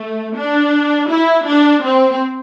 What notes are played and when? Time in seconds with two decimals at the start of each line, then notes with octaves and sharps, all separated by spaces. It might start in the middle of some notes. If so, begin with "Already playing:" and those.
Already playing: A3
0.37 D4
1.09 E4
1.47 D4
1.84 C4